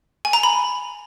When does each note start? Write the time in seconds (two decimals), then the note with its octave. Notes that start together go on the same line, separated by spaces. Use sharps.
0.25 G#5
0.33 A#5
0.43 B5